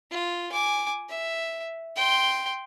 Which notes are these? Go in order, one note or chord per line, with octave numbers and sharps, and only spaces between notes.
F4
G#5 D6
E5
G5 C6